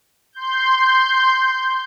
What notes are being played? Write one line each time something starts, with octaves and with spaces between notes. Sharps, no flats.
C6 G6